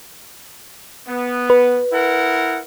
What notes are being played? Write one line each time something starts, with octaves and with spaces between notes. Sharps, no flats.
B3
B4
E4 A#4 F#5